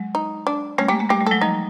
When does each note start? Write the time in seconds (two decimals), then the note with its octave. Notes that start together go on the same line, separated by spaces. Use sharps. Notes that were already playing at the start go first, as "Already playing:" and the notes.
Already playing: F#3 G#3
0.15 D#4
0.47 D4
0.78 G3 A3 C#4
0.88 G#3 A#3 G4
0.99 G#3 A#3
1.10 G3 A3 G4
1.20 G3 A3
1.26 F#3 G#3 A4
1.41 F3 G3 D#4